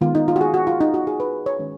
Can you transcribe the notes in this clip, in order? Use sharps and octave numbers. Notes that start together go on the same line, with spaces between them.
D#3 G#3 B3 F4
D#4
F4
F#4
G#4
F#4
F4
D#4
F#4
G#4
B4
C#5
D#3 G#3 C#4